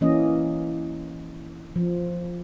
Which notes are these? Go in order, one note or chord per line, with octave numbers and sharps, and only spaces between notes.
E3 A#3 C#4 D#5
F3